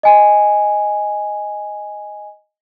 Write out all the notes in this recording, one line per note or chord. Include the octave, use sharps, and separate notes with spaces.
D#5 G#5